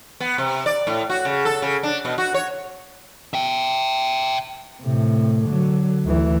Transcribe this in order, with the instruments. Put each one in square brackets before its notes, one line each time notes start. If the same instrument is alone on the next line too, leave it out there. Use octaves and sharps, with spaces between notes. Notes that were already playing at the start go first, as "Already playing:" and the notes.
[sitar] B3
C3
D5
A2
F#4
C#3
A4
C#3
D4
B2
F#4
C#5
[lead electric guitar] E5 G5
[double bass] A2 C3
D3 F#3
D2 E3